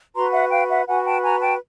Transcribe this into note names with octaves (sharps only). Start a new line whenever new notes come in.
F#4 B4 A#5 C6
E5 F#5
F5 G5
E5 F#5
F#4 B4 F#5 G#5
G5 A5
G#5 A#5
G5 A5